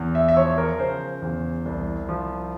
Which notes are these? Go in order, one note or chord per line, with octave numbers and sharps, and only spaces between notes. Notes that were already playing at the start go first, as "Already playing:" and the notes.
Already playing: E2
E5
E5
F3 C#5
A#4
C#3 C5
E2
C2
F3